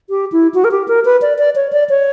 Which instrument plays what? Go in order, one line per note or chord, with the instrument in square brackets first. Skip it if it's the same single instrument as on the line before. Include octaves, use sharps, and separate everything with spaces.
[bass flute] G4
E4
F#4
A#4
G4
A#4
B4
D5
D5
C#5
D5
C#5